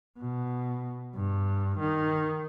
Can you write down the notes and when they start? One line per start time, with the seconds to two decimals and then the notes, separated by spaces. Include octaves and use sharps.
0.19 B2
1.15 G2
1.79 D#3